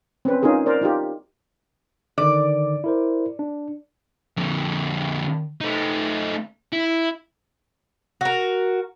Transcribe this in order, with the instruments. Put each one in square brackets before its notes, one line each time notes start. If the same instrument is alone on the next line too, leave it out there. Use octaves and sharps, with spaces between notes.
[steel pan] C4 C#4 B4
C#4 D#4 F4 G#4 A#4
A#4 C5 D5
D#4 F4 G4
[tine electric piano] D3 D#3 [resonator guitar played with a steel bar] D5
[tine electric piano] E4 A#4 C5
D4
[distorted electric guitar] F2 D3
A3 D#4
E4
[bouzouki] F#4 A#4